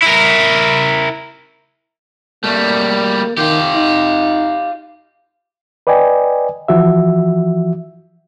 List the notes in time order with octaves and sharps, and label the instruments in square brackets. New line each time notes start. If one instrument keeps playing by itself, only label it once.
[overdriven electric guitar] E4 A#4
[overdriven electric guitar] G3 A3 [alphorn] A#3
[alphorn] D#3 [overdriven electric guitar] F4 G4
[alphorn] D#4
[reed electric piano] B4 D5 D#5 G5 G#5
E3 F3 F#4 E5